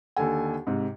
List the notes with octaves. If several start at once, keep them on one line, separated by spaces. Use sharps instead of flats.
D#2 D3 A4 G#5
G#2 C3